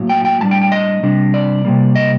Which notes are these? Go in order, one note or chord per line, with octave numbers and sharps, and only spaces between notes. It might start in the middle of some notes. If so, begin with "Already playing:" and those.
Already playing: A2 F#3 A#3
G5
G5
A2 G3 D4 A5
G5
G5
D#5
C3 G3 D4
D5
C3 G3 A#3
D#5